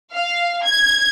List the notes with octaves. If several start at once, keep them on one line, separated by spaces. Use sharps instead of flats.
F5
G#6